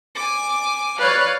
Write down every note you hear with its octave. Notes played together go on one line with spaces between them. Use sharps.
G#5 D6
B4 C#5 D5 F5